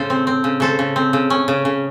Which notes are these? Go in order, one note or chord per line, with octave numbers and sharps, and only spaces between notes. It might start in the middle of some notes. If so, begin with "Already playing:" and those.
Already playing: A2 C#3 A4 C5
C4
C4
C#3
C#3 A4 C5
C#3
C4
C#3
C#4
C#3
C#3